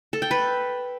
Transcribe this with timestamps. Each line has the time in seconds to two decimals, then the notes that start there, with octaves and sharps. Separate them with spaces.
0.13 A4
0.22 G5
0.31 B4